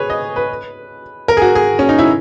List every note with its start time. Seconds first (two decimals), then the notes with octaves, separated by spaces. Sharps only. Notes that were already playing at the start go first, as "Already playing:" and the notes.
Already playing: G#4 B4 C#5
0.10 D#5
0.36 B4
1.28 A#4
1.37 G#4
1.42 F#4
1.55 G#4
1.79 C#4
1.89 D#4
1.98 E4